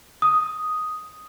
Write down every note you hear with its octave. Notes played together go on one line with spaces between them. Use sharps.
D#6